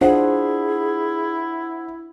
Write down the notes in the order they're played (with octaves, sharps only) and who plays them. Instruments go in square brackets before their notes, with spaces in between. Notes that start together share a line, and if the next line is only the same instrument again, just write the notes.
[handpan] D4 F4 [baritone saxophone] E4 [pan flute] G#4 [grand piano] C5 F#5